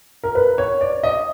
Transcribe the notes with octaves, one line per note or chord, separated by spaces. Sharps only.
A#4
B4
C#5
D5
D#5